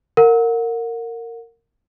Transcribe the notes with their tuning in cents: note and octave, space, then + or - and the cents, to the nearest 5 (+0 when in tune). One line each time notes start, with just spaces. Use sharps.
A#4 -20 F#5 -30